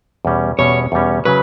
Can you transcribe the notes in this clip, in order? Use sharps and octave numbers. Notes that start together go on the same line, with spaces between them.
E2 B2 G3 C#4
E2 B2 G3 C#4 C#5
E2 B2 G3 C#4
C#3 F#3 C#4 B4